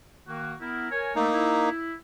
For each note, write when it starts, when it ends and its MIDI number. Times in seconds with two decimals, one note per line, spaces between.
0.26 0.54 51
0.26 0.54 58
0.26 0.54 66
0.59 0.86 59
0.59 0.86 64
0.59 0.86 70
0.91 1.14 70
0.91 1.14 73
0.91 1.14 80
1.16 1.26 57
1.16 1.69 58
1.16 1.69 63
1.32 1.93 64